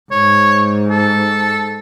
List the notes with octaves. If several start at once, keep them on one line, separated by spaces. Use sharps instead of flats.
G#2 C#5
A4